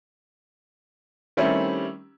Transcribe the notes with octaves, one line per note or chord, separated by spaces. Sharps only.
D#3 G3 A3 C4 C#4 E4